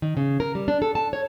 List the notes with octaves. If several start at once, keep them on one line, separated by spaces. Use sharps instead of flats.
D#3
C#3
A#4
G3
D4
A4
A5
C#5